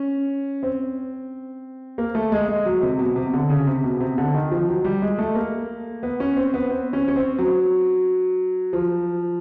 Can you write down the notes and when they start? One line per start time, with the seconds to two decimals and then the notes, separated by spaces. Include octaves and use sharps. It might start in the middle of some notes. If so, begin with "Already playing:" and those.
Already playing: C#4
0.63 C4
1.98 A#3
2.15 A3
2.32 G#3
2.48 G#3
2.66 F#3
2.82 C3
2.99 B2
3.16 C3
3.34 D3
3.50 C#3
3.66 C3
3.84 B2
4.00 C3
4.18 D3
4.34 D#3
4.51 F3
4.68 F#3
4.85 G3
5.02 G#3
5.19 A3
5.35 A#3
6.03 B3
6.20 C#4
6.37 C4
6.54 B3
6.71 C4
6.93 C#4
7.08 C#4
7.16 C4
7.39 F#3
8.73 F3